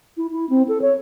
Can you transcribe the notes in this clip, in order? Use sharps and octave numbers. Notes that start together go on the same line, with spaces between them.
E4
E4
C4
A4
C#5